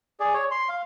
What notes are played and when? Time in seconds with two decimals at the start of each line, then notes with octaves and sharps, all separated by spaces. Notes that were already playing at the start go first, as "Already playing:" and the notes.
0.20 G#4 D5
0.34 C#5
0.51 C6
0.69 F5